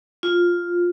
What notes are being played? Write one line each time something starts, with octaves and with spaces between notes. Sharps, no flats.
F4